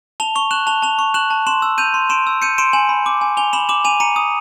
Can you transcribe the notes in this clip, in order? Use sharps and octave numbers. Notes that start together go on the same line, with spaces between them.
A5 F7 G7
C#6 F7 G7
F#6 E7 F#7
A5 F7 G7
A5 F7 G7
C#6
F#6 E7 F#7
A5
C6 E7 F#7
E6
G6 D#7 F7
C6
C6 D7 E7
E6
G6 C#7 D#7
C6 D7 E7
G#5 E7 F#7
B5
D6
G#5
G#5 F7 G7
B5 E7 F#7
D6 E7 F#7
G#5 D#7 F7
A#5 C#7 D#7
D#6